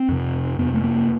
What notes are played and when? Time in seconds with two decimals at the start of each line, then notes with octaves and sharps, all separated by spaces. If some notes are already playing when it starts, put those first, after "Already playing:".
Already playing: C4
0.09 F2 C3
0.59 F2 C3 B3
0.74 A3
0.84 A#3